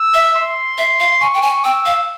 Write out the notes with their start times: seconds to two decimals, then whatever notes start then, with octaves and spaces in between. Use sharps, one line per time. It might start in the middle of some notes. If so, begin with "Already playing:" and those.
Already playing: E6
0.14 E5
0.36 C6
0.78 E5
1.00 F5
1.21 G#5 C#6
1.34 G5
1.42 G#5
1.64 G5 E6
1.86 F5